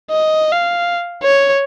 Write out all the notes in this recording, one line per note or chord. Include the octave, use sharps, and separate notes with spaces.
D#5
F5
C#5